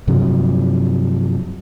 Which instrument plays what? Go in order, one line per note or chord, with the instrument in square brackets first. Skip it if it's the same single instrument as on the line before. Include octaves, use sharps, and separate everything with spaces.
[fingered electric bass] G2 C3 F3 F#3